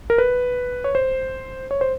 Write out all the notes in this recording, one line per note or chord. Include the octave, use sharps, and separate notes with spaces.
A#4
B4
C#5
C5
C#5
C5